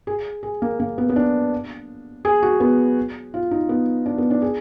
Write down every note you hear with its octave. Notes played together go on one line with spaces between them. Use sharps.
G#4
G#4
A#3
A#3
B3
B3
D4
G#4
F#4
B3
F4
D#4
B3
D4
B3
D4
G#4